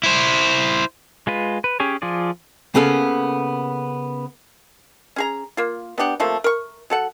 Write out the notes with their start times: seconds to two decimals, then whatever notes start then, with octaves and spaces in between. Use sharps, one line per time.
0.03 E4 C5
1.27 G#3 F4 B4
1.64 B4
1.80 C#4 G4 G#4 C#5
2.02 F3 F4 G#4 D5
2.75 C#3 A#3 B3 C#4 A4
5.16 C#4 G#4 A#5
5.57 A#3 F4
5.98 B3 D4 G4 F#5
6.20 C3 F3 A3 A#3
6.44 A#4 C#6
6.90 F#3 A4 F#5